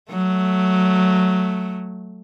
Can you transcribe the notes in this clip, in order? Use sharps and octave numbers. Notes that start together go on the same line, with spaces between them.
F#3 A3